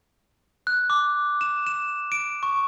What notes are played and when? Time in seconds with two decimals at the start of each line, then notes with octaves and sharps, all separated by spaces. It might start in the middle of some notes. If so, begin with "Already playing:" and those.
0.67 F#6
0.90 D6
1.41 E7
1.67 E7
2.12 D7
2.43 C#6